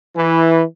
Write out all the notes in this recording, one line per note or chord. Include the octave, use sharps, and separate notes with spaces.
E3